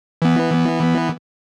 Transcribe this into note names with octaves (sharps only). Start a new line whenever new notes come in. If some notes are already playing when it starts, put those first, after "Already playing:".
E3 B3